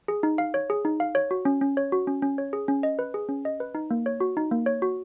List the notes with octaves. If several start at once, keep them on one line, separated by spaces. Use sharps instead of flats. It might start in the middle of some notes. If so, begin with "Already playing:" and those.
G#4
D#4
F5
C#5
G#4
D#4
F5
C#5
F#4
C#4
C#4
C#5
F#4
C#4
C#4
C#5
G#4
C#4
D#5
B4
G#4
C#4
D#5
B4
D#4
A#3
C#5
F#4
D#4
A#3
C#5
F#4